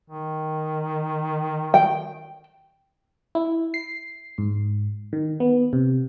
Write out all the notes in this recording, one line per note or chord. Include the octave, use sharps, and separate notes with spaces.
D#3
G5
E4
C7
G#2
D#3
B3
C3